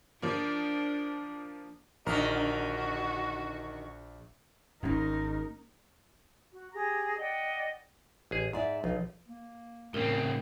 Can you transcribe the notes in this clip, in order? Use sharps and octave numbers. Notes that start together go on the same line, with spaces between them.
F3 A#3 D4
A#1 D3 D#3 F#4 A#4
G#1 A#3 C#4 D#4 A#4
F#4
G4 G#4 A#5
D5 D#5 F#5 G5
A1 G#4
G#2 G#4 D5 E5
B1 F3
A#3
C#2 A2 C#3 C4 A#4